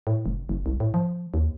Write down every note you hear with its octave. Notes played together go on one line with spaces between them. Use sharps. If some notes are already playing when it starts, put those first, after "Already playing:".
A2
F1
F#1
C2
A2
F3
D#2